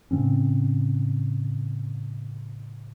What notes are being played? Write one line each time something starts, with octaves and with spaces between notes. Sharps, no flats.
A2 C#3 C4 C#4